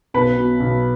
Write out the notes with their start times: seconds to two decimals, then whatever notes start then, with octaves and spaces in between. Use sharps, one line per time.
0.14 B1 B4
0.37 B2
0.60 B1